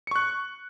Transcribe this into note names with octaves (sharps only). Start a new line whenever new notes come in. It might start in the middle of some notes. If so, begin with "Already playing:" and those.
C#6 F#6 C#7